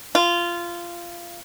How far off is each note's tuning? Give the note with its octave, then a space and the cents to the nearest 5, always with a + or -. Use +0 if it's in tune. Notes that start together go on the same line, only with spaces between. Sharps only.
F4 -15